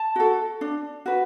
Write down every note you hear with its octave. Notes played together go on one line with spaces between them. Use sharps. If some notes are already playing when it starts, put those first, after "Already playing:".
Already playing: A5
F#4 A4
D4
F#4 B4